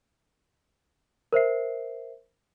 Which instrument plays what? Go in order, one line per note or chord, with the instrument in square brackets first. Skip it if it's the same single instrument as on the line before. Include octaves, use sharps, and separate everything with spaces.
[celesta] A#4 C5 E5 C7